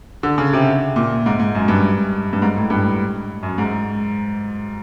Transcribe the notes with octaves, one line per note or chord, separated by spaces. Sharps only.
D3
C#3
C3
A#2
G#2
G#2
F#2
G2
G2
G#2
A2
G2
F#2
G#2